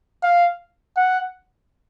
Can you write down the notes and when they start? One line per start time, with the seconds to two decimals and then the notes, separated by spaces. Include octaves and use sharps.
0.23 F5
0.96 F#5